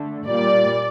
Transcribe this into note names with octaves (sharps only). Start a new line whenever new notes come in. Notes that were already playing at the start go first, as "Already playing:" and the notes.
Already playing: D3 A3
A#2 G3 A#3 D5